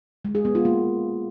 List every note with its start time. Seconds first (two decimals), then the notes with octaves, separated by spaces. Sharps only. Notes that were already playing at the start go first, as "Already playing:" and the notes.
0.25 G#3
0.35 G#4
0.45 B3
0.55 F4
0.65 A#3